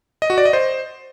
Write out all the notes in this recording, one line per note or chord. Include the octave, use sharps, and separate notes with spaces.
D#5
F#4
D5
D#5
C5